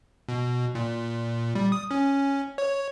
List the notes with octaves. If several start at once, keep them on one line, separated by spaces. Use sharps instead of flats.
B2
A#2
G3
D#6
C#4
C#5